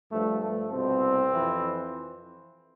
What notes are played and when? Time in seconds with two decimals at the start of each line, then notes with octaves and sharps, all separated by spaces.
0.12 G2 F3 A3
0.42 A3
0.72 C2 B2 C4
1.32 F2 E3